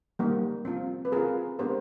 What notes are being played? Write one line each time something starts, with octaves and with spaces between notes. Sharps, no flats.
G3 A#3 D#4
C4 F4
B4
C4 F4 G#4 A#4
G#3 B3 D4 G4 A#4 C5